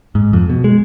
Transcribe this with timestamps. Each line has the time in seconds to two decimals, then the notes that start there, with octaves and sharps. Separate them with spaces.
0.15 G#2
0.33 F2
0.50 B2
0.64 G#3